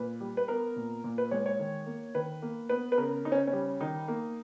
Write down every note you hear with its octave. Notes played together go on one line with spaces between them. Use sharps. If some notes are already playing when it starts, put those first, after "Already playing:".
Already playing: A#2 B4
G3
B4
B3 A#4
A#2
A#2
B4
G#3 C#5
C#5
D#3
A#3
D#3 B4
A#3
B3 B4
B4
C#3 A#4
C#3 D#4
C#4
C#4
G3
D#3 D#4
A#3